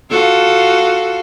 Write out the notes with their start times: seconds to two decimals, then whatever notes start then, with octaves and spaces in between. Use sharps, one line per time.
0.10 F4 F#4 A4